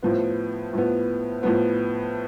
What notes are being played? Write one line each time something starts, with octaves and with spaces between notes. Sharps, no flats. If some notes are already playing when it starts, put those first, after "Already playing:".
A2 F3 B3
A2 F3 B3
A2 F3 B3